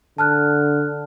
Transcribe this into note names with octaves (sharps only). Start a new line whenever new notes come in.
D3 A5 F6 F#6